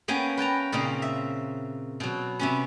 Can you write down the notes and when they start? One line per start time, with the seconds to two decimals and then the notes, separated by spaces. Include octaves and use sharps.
0.08 A#3 B3 C#4 G5 G#5
0.37 B4 G5 A5 A#5
0.72 A#2 C#3 A#3 C4 D#4
1.02 E5
2.00 B2 F#3
2.39 C3 B3 C#4